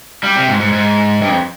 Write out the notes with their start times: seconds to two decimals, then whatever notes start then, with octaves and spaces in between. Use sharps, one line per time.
0.23 G3
0.36 C3
0.48 G#2
0.60 G#2
0.72 G#2
1.21 G2
1.29 F2